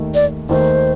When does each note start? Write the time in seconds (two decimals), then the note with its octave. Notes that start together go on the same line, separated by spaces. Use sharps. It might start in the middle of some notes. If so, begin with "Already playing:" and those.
Already playing: D#2 D#3 A3
0.15 D5
0.49 D#2 D#3 A3 C5